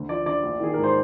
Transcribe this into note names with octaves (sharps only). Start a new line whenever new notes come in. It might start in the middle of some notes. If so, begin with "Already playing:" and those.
Already playing: D2 D3
F3 D5
D3 D5
A#1
D#3 G#4
G#2 A#4
C5